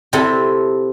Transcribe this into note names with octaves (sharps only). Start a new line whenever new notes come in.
C3 C4 E4 A4